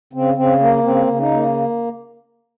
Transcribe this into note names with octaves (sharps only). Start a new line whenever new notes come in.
C#3 C4
C#3 C4
A#3
C#3 C4
C#3
D#4
A#3